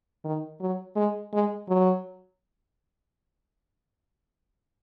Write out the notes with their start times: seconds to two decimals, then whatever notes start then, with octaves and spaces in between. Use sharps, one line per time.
0.24 D#3
0.60 F#3
0.96 G#3
1.33 G#3
1.68 F#3